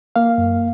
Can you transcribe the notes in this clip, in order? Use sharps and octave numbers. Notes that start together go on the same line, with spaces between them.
A#3 F5
F#2